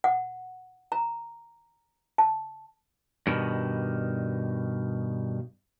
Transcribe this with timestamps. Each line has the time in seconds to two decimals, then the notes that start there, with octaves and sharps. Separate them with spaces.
0.04 F#5
0.92 A#5
2.18 A5
3.27 G2 B2 D#3